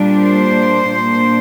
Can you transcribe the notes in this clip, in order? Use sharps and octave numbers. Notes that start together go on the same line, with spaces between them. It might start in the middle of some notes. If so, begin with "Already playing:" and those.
Already playing: A#2 G3 A#3 D4
C5
A#2 A#3 D4